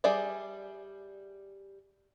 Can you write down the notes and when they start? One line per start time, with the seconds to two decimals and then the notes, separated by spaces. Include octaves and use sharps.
0.04 G3 G#4 D5 E5